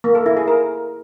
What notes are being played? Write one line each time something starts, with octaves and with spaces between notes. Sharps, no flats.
A#3
A4
E4
G#4
A#4